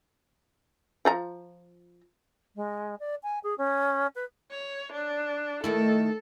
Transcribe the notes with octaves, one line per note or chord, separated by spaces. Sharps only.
F3 F4 A#5
G#3
D5
G#5
G#4
C#4
B4
C#5
D4
D#3 A3 E4 A4